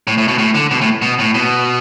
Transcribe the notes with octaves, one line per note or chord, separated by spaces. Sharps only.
A2
A2
B2
A2
D3
B2
A2
B2
A2
B2